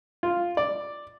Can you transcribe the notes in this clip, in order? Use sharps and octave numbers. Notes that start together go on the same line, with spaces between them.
F4
D5